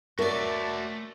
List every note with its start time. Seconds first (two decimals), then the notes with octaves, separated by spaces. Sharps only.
0.19 A3 F#4 A#4 C#5 D5 E5 A5